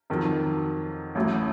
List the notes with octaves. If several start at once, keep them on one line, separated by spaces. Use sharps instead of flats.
F2 D#3 F#3
A1 A2 F#3